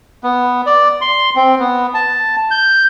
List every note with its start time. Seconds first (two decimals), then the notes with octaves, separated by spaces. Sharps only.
0.24 B3
0.66 D5
1.01 C6
1.36 C4
1.59 B3
1.94 A5
2.51 G6